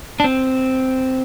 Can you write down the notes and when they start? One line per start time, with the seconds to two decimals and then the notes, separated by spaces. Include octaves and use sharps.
0.20 D4
0.24 C4